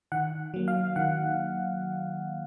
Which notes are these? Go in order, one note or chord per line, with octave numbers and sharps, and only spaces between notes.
D#3 F#5
F#3 A#3
F5
D#3 F#5